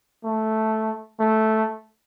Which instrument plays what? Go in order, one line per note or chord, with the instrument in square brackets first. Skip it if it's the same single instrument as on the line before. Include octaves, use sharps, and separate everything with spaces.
[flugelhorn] A3
A3